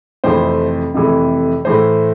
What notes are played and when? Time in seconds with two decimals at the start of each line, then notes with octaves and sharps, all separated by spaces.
0.24 F2 C3 E3 A3 C5
0.94 F2 C3 E3 A3
1.65 A2 E3 A3 C5